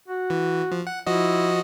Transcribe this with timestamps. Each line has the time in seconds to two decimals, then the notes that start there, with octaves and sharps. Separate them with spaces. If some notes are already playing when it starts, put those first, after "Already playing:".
0.08 F#4
0.30 E3
0.72 F3
0.87 F#5
1.06 F3 E4 F#4 D#5